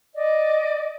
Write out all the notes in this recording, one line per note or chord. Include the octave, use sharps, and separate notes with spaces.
D5 D#5